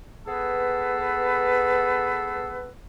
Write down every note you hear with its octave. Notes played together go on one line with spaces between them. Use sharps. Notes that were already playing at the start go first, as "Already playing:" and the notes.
B3 G#4 A4 B4